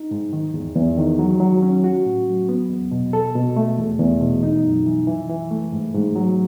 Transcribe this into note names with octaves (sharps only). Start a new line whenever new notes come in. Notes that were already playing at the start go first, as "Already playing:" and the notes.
Already playing: D#4
G#2
D#3
E2
E2
D#3
F#3
F#3
C#4
F#4
A2
F#3
B3
E2
B2
A4
B2
A3
E2
E2
B2
D#4
F#2
E3
E3
E3
A3
G#2
G#2
F#3